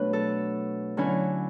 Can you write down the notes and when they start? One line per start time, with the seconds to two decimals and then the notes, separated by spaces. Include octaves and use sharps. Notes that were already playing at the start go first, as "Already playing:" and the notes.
Already playing: B2 F#3 A3 D4 B4
0.13 A4
0.97 D3 F#3 C#4 E4